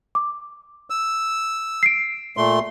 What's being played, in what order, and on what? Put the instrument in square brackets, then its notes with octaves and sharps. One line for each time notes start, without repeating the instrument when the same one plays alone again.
[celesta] D6
[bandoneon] E6
[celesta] C7 D7
[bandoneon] A#2 A3 C6